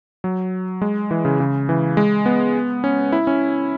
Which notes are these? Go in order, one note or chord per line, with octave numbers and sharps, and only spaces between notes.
F#3
G#3
E3
C#3
C#3
E3
G#3
B3
C#4
E4
C#4